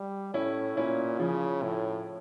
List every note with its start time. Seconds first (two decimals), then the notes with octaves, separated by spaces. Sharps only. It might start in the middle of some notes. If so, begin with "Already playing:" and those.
Already playing: G3
0.34 A2 C#4 E4
0.77 A#2 C#4 E4
1.19 C#3 F3
1.63 A2